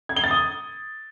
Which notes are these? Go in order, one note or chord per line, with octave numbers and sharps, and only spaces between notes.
G#6
G7
A6
D#6